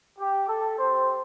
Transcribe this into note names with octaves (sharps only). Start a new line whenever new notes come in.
G4
A4
C4 G4 C5